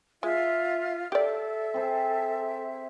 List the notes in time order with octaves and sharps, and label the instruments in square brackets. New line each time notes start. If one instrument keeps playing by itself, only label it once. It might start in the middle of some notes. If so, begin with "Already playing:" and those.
[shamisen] G#3 [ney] F4 [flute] E5
[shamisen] G4 D5 [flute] A4 [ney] E5
[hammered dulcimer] C4 G#4 C5